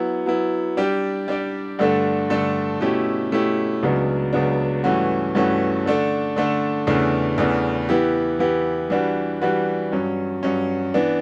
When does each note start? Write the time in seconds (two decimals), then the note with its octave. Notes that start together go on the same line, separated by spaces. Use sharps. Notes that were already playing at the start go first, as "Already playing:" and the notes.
Already playing: F#3 B3 E4
0.26 F#3 B3 E4
0.77 G3 D4 G4 D5
1.28 G3 D4 G4 D5
1.79 G2 D3 A3 D4 A4
2.30 G2 D3 A3 D4 A4
2.81 B2 A3 C#4 E4 G4
3.32 B2 A3 C#4 E4 G4
3.83 C#2 C#3 F#3 B3 D4
4.33 C#2 C#3 F#3 B3 D4
4.84 G2 E3 A3 C#4 F#4
5.35 G2 E3 A3 C#4 F#4
5.85 D3 A3 D4 A4
6.36 D3 A3 D4 A4
6.87 E2 C#3 E3 A3 D4
7.38 E2 C#3 E3 A3 D4
7.89 E3 B3 E4 G4
8.39 E3 B3 E4 G4
8.90 E3 G3 D4 F#4 B4
9.41 E3 G3 D4 F#4 B4
9.92 G2 F#3 C#4
10.43 G2 F#3 C#4
10.94 E3 B3 D4